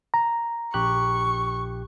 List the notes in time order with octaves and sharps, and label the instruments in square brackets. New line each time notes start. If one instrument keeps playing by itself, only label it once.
[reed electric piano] A#5
[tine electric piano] A#1 G4 F#6 [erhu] C#6